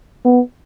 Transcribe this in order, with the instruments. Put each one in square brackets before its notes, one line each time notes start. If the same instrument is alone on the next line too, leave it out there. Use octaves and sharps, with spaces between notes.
[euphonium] B3